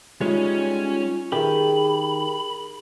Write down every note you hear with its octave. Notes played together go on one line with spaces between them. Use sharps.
G3 G#3 C#4 D#4 F4 C#5
D#3 G4 G#4 B5